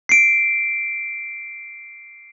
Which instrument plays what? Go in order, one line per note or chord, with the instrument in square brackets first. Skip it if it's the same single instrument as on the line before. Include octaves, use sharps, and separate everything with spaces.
[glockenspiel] C7 D7